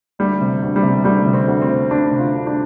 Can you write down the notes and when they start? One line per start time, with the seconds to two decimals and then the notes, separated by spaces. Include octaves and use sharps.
0.19 D2 G3
0.41 C3
0.62 D2
0.76 G3
0.83 C3
1.04 D2 G3
1.26 C3
1.33 C4
1.48 D2
1.62 C4
1.69 C3
1.91 D2 D4
2.11 C3
2.19 F4
2.33 D2
2.47 D4